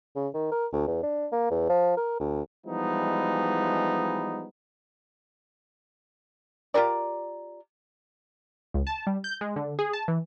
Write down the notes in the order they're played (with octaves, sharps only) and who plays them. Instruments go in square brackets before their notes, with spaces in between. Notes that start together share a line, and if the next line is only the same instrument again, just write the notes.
[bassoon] C#3
D#3
A#4
D2
E2
D4
A#3
E2
F3
A#4
D2
[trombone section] E3 F3 G3 G#3 B3 D#4
[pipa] F4 G4 A#4 D5
[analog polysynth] C#2
A5
G3
G6
G#3
D3
G#4
A5
E3